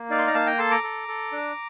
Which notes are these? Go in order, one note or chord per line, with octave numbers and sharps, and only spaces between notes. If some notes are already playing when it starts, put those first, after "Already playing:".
Already playing: A#3
D#4 D5 F5
C6
A#5
A#3 F5 A5
G5 A#5
A4 A5 C6
A#5 D6
A4
A4
D4